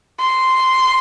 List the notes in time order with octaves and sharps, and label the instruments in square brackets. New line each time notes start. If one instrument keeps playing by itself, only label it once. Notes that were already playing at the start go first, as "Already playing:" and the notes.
[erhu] C6